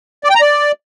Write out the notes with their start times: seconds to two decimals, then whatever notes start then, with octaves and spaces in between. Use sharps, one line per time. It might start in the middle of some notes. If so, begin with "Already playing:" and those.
0.24 D5
0.30 G5
0.35 A#5
0.41 D5